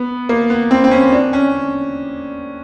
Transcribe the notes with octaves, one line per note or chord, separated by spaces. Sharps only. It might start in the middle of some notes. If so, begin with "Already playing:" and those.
Already playing: B3
A#3
B3
C4
C4
C#4
D4
C#4